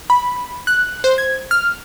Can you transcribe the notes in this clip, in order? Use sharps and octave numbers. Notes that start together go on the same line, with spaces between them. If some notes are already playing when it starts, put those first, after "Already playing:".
B5
F#6
C5
G#6
F6